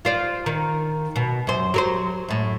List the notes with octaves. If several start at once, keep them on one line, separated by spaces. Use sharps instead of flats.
F4 C5 D5
D#3
B2
F#2 C5
F#3 A#4 C5
F#2 A2